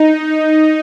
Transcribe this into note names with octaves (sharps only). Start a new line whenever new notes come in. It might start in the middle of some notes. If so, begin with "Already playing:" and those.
Already playing: D#4